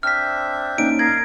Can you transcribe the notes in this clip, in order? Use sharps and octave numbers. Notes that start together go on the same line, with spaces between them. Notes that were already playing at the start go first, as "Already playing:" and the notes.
C4 D4 E5 F6 B6
A#3 C#4 D#4 D7
A#4 D#5 F5 G#6